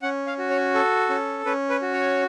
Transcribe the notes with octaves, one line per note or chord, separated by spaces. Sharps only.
C#4 F#5
F5
F#4
C#5
A4
C#4
C#4 B4
B4
F#4
C#5